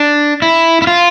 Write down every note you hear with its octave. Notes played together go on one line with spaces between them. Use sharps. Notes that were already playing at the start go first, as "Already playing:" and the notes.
Already playing: D4
E4
E4
F4